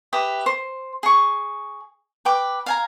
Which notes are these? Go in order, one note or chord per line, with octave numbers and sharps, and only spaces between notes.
G4 B4 E5 D#6
C5
G#4 C#6
B4 G5 D6
F5 G#5 A#5